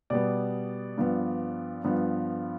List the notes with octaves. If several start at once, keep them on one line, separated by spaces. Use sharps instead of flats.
B2 G3 B3 D5
G2 F3 B3
G2 F3 B3